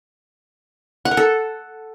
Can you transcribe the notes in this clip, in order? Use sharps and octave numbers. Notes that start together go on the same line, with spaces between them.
F#5
A#4
A4